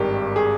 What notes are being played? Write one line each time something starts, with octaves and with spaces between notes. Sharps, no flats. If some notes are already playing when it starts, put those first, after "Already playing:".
Already playing: G#1 G2 D#3 G4
G#4